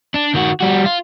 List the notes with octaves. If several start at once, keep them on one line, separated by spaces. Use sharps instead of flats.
D4
D#3 F#4
G3 F#4
F4